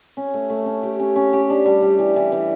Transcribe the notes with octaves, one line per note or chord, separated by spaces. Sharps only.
C#4
A3
A3
C#4
G4
C#4
C#4
G4
D4
G3
G3
E3
E3
E3